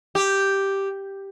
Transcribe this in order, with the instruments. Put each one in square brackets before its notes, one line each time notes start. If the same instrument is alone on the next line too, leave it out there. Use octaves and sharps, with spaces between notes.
[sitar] G4